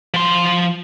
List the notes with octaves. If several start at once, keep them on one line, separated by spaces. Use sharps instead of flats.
F3 C6